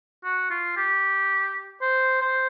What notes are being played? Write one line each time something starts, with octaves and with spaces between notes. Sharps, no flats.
F#4
F4
G4
C5
C5